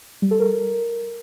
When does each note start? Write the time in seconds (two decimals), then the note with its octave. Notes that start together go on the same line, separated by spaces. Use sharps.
0.22 G3
0.31 A4
0.39 A#4